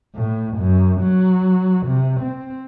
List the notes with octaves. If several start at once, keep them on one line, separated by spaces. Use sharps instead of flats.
A2
F#2
F#3
C3
C4